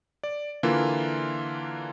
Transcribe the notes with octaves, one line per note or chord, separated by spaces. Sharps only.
D5
D3 E3 A#3 F4